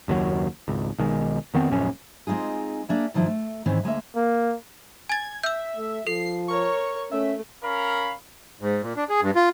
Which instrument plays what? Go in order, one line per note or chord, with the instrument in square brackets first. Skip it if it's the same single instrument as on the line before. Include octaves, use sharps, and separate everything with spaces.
[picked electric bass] F#1 D#2 B2 F#3
G#1 C#2
B1 D#3 G#3
F2 D#3 B3 C4
D#1 A#1 F#2 C#4
[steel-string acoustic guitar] G#3 C4 D#4 F4 G#4
A#3 D4 G#4 E5
G2 D#3 F3 E4
A3
G#2 D#3 E3 C4 C#4
D2 G#3 A#3 E5
[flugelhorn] A#3
[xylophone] G#5 A6 [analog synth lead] G#6
[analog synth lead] E5 [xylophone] E6 G6
[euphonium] A3
[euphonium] F3 [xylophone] A4 [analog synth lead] C7
[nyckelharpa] A#4 C#5 [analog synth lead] C#6
[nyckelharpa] A3 [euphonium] C#4 [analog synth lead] E5
[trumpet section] C#4 A#4 F5 B5
[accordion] G#2
A#2
D4
G#4
G2
F4